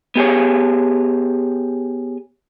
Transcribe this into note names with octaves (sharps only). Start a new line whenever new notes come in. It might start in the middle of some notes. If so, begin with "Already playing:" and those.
B3 G4 G#4 C#5